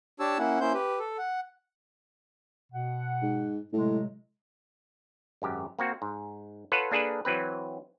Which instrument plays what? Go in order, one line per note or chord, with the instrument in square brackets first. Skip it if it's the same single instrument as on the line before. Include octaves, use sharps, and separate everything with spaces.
[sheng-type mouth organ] D4 G4 C#5 A5 E6
A#3 C#4 E4 F#5
A#3 C#4 E4 C5 G6
G4 B4
A4
F#5
[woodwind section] B2 F#5
[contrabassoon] G#2
[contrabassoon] A2 [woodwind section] C3 F#3 G#3
[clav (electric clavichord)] G#1 F#2 G4
A#3 C4 F#4
G#2
F4 A4 B4 C#5 F#5
A#3 D4 G#4 A4 B4
E3 F#3 C4 B4